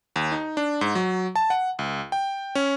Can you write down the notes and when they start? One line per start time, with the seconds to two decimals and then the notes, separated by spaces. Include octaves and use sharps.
0.16 D#2
0.32 D#4
0.57 D4
0.81 G#2
0.95 F#3
1.36 A5
1.50 F#5
1.79 C#2
2.12 G5
2.55 C#4